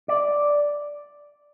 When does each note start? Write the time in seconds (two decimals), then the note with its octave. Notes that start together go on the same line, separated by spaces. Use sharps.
0.08 D5